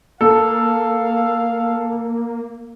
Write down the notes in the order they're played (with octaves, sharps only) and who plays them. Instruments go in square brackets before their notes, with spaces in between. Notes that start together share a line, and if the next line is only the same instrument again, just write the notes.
[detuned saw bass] A#3 [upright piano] A4 [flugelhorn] F5